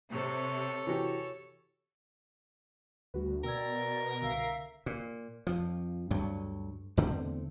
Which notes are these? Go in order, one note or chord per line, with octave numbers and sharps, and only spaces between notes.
C3 A4 C#5
E3 F#4 G4
D2 G3 F#4 B4
B2 A#4 D5 G5 E6 G#6
C2 D3 E5 F5 E6
A#2
F2 F3
D2 G2 F#3
E2 D3 A3 C4